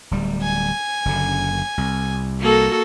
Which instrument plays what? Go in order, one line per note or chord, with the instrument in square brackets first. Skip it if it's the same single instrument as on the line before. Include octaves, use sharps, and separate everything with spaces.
[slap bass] D1 G3
[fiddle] G#5
[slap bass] F#1 F#2 D3
C2
[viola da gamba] A#3 F#4 A4